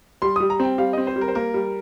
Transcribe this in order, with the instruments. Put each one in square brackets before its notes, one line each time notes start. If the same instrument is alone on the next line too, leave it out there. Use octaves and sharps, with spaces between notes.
[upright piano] G3 [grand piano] C6
[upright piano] G3 [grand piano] D#6
[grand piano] A#5
[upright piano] C4 [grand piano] G5
[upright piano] G3 [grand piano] F5
[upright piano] C4 [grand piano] D#5
[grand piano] C5
[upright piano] G3
[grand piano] A#4
C5
[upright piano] A#3 [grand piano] A#4
[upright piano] G3